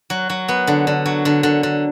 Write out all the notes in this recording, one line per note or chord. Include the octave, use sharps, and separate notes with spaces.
F#3
F#3
B3
D3
D3
F#3
D3
D3
D3